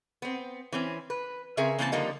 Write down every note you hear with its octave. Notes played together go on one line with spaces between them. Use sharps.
B3 C4
E3 C4 C#4
B4
C#3 C4 G#4 A#4 E5
C#3 E3 A#3 C4 D4 A5
D3 F3 G3 A#3 D#4